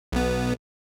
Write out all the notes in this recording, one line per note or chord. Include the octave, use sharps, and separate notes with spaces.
B1 B3